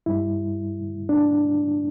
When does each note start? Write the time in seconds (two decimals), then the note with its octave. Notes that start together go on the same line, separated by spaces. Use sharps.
0.06 G2 G3 E4
1.09 D4